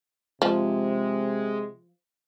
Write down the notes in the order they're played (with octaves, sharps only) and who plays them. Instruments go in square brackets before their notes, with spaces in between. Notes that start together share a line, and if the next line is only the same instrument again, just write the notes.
[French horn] C3 [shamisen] F3 [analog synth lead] G#3